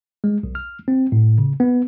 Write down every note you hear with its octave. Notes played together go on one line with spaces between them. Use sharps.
G#3
B1
F6
C4
A2
C#3
B3